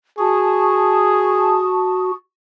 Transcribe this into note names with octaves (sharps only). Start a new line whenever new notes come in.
F#4 G#4 A5 C#6 D#6